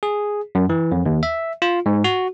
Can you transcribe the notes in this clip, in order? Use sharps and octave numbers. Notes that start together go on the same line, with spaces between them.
G#4
F#2
E3
F2
D#2
E5
F4
G#2
F#4